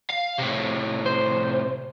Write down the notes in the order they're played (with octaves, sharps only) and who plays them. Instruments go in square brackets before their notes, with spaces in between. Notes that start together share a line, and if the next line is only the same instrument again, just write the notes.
[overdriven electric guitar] F5
A2 C3
[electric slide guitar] C5